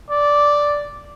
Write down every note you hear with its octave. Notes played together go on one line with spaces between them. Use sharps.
D5